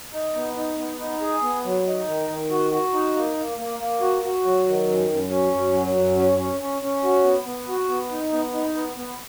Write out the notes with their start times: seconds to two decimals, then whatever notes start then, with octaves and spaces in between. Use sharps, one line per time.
0.13 D#4
0.35 B3
0.56 D#4
0.79 B3
0.99 D#4
1.21 G#4
1.42 B3
1.65 F#3
1.86 D#4
2.07 D#3
2.29 D#3
2.50 F#4
2.71 F#4
2.93 D#4
3.15 A#3
3.37 A#3
3.58 A#3
3.79 A#3
4.01 F#4
4.22 F#4
4.44 F#3
4.66 D#3
4.87 F#2
5.09 F#2
5.30 C#4
5.53 F#2
5.74 F#3
5.96 F#2
6.16 C#4
6.38 C#4
6.60 C#4
6.81 C#4
7.03 F#4
7.24 B3
7.46 B3
7.68 F#4
7.89 B3
8.11 D#4
8.32 B3
8.53 D#4
8.75 B3
8.96 B3